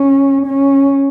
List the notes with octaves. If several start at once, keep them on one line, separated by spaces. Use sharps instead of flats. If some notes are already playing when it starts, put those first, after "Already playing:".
Already playing: C#4
C#4